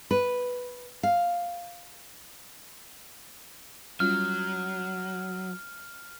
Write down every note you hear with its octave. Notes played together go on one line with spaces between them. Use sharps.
B4
F5
F#3 G3 C#4 F4 F6